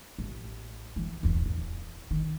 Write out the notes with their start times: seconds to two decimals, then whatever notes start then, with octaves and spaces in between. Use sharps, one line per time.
0.19 A1
0.96 E3
1.23 D1 E2
1.46 E2
2.11 D#3